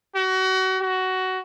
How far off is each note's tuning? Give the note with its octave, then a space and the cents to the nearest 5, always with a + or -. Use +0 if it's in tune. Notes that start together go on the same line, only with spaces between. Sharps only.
F#4 +30
F#4 +15